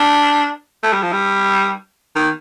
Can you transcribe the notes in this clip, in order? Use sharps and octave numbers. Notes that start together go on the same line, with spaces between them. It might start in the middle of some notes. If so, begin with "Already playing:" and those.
Already playing: D4
A3
G3
F3
G3
D#3